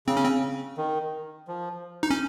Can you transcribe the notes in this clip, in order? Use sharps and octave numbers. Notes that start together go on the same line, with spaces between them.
C#3 C4
C#4
C4
D#3
F3
D#4
C#4